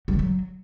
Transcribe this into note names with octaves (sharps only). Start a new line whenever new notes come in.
F#3
D3
F#3